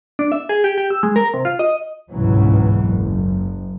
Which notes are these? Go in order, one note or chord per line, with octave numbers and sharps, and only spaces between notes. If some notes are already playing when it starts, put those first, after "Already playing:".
D4
E5
G#4
G4
G4
E6
G#3
A#4
C3
F4
D#5
G1 C#2 G#2 B2 E3 F#3
F#1